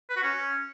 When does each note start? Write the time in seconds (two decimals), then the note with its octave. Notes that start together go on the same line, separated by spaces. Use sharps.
0.10 B4
0.16 F#4
0.23 C#4